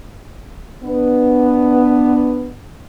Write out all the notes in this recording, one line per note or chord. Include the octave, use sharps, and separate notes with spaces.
B3 D4